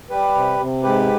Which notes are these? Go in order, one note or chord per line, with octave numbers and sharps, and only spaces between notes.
G3 G4 B4
C3
C3
G#2 G4 B4